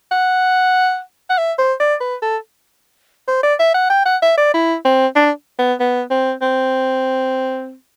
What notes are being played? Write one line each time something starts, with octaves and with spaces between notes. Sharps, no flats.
F#5
F#5
E5
C5
D5
B4
A4
C5
D5
E5
F#5
G5
F#5
E5
D5
E4
C4
D4
B3
B3
C4
C4